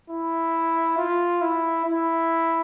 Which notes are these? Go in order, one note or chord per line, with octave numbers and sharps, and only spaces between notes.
E4
F4
E4
E4